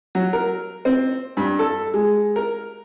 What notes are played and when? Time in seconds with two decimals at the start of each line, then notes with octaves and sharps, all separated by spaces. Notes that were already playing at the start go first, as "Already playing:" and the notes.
0.15 F#3
0.33 A#4
0.85 C4
1.37 G2
1.59 A4
1.94 G#3
2.36 A#4